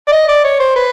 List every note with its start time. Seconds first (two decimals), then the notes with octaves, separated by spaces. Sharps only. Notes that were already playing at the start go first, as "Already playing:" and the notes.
0.08 D5
0.12 D#5
0.28 D5
0.44 C#5
0.60 C5
0.76 B4